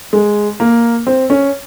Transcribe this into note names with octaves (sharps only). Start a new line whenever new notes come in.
G#3
A#3
C4
C#4